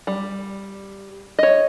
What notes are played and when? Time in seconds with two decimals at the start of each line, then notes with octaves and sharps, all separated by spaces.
0.07 G3
1.39 C#5 D#5